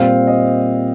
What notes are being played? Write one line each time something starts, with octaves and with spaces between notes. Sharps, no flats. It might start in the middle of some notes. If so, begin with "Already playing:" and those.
Already playing: A#2 G3 C4 C5 F5
D#5